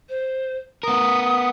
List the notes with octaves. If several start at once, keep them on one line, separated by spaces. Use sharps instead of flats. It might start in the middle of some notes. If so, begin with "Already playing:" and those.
C5
B3 A#4 D#6